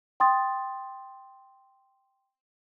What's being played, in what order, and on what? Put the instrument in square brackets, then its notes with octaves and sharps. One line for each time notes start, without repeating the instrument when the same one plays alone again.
[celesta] G5 C6 D#6 A6